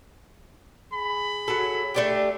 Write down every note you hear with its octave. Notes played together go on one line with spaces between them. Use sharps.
G#4 B5
F#3 A4
A3 D4 G4